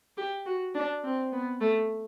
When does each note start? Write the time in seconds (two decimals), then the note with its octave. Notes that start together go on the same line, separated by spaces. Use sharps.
0.17 G4
0.46 F#4
0.75 D4
1.04 C4
1.32 B3
1.61 A3